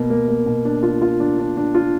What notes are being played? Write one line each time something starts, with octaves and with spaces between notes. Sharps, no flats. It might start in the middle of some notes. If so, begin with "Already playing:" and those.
Already playing: B2 A#3
A#3
A#3
B2
D4
F4
F4
D4
D4
D4
F4